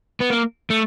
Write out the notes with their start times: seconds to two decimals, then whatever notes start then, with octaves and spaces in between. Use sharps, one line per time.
0.20 B3
0.30 A#3
0.70 A3